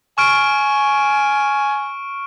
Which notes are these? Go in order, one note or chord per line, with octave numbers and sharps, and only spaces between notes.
G#5 C#6 F6 D7